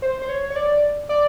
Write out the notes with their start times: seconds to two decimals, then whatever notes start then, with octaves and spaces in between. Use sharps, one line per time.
0.02 C5
0.22 C5
0.29 C#5
0.50 C#5
0.56 D5
1.09 D5